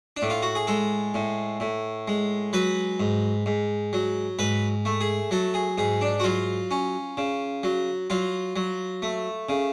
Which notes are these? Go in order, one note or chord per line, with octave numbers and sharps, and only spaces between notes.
D4
A2
F4
F#4
G#4
G#3 A4
A2
A2
G#3
F#3 B4
G#2
G#2
F#3
G#2 B4
A3
G#4
F#3 A4
G#4
G#2 G#4
D4
F#4
F#3 F4
C#4
C#3
F#3
F#3 F4
F#3
A3
C#3